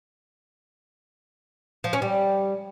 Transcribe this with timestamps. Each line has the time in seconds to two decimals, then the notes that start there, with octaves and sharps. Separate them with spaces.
1.84 F3
1.93 C#4
2.02 G3